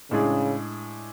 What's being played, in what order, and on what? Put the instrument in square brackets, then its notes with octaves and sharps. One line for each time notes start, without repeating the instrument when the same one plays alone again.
[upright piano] A2 G#3 D4 G#4 [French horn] C#3